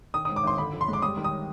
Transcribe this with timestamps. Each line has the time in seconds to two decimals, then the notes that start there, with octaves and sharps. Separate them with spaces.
0.14 D#3 D#6
0.25 D#6
0.29 G#2
0.36 D6
0.44 G#1 C6
0.58 D3 B5
0.73 F2
0.81 C6
0.88 G#3
0.93 D6
1.02 G3 D#6
1.17 D#3
1.24 D#6